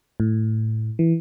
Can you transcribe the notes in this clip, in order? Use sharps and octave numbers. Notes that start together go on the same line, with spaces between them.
A2
E3